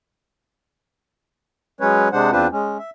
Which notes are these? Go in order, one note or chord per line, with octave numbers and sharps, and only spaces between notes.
F#3 G#3 C#4 B4 C#5
C3 G#3 D4 C5 F#5
E2 C4 D4 F4 B4 C5
G#3 C#4
E5